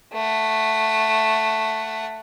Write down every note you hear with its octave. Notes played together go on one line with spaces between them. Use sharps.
A3 F#5